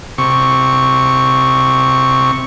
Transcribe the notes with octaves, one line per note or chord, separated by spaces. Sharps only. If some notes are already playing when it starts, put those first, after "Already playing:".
C3 C#6